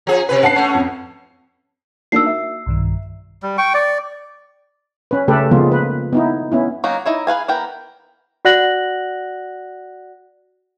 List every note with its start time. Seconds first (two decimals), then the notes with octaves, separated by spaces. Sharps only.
0.07 F3 G#4
0.29 C3 B4
0.43 F#5 A5 C7
0.56 A3 C#4
0.75 F2
2.12 A#3 D4 D#4 F#4 E6 C7
2.26 E5
2.66 B1 G2 D#3
3.43 G3
3.58 G5 C#6
3.74 D5
5.11 C#4 B4
5.28 C#3 A3 G4 A4 B4
5.51 C#3 F3 G#3 A#3 B3 F4
5.72 B4
6.13 B3 D#4 E4
6.52 B3 C#4 E4
6.84 F#3 A#3 C#4 D#4 F#4
7.06 D#4 E4 C#5
7.27 G#4 B4 F5 G#5
7.48 E3 B3 A#4 G5
8.45 F#4 D5 F#5 F#6 A#6 F#7